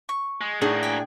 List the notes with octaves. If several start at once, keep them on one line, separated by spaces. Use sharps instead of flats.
C#6
G#3
A2 A#3 D4 D#4 F#4 G#4
G5 G#5